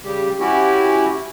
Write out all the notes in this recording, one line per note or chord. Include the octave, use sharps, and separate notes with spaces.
C#3 G3 G4
C#4 E4 F#4 G4